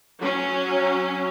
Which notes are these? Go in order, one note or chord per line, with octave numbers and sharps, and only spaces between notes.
F#3 C#4